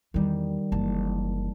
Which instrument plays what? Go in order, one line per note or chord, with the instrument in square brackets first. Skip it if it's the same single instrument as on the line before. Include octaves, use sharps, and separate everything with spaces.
[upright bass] E2 E3 [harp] D#3 G3
[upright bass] F#1 E3 [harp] A5